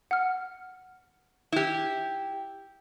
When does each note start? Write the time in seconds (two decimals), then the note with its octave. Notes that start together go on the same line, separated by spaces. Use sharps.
0.11 F#5 F6
1.52 E4 G4